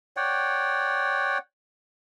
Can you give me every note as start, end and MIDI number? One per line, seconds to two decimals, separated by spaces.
0.17 1.38 73
0.17 1.38 74
0.17 1.38 78
0.17 1.38 79